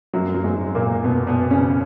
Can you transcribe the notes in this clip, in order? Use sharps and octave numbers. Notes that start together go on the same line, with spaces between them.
F#2 F#3
F#3
G#2 G#3
A#2 A#3
B2 B3
B2 B3
C#3 C#4